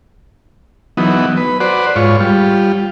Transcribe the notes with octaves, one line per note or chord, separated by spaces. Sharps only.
E3 F#3 B3 D#4
B4
F#4 B4 C5 D5
G#2 F4 C#5
G3 F4